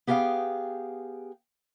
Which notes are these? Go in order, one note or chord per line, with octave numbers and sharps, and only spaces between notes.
B3 G4 G#4 D#5 F5 G5